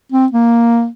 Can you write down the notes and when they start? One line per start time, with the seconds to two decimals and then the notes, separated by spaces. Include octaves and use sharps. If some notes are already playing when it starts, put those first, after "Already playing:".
0.12 C4
0.32 A#3